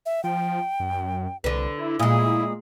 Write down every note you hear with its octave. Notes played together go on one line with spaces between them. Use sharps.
E5
F3 G5
F#2
C2 D3 B4
E4
A#2 G#3 E4 D#6